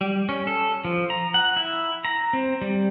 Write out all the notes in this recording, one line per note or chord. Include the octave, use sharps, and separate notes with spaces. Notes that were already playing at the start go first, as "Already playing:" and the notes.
G3
C#4
A4
F3
A#5
F#5
E4
A#5
C4
G3